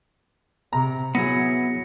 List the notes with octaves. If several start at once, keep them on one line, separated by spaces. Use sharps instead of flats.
C3 A#5
F#3 B3 E4 G#4 A#6 C#7